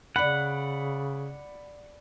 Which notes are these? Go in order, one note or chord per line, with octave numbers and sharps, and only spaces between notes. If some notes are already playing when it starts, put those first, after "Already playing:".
C#3 D5 F#5 B5